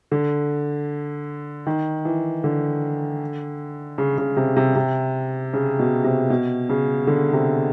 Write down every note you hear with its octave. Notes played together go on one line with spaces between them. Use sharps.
D3
D#3
E3
D3
C#3
C#3
C3
C3
C3
C#3
B2
C3
B2
C#3
D3
C3